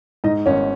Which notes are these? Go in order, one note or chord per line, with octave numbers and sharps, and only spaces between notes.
G#2 D#4 D#5
G#1 C#4 C#5